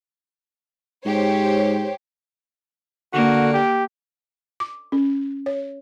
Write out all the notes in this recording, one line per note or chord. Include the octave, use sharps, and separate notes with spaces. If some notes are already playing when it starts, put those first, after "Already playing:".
G#2 G4 C5 C#5
D3 A#3 F#4
G4
D6
C#4
C#5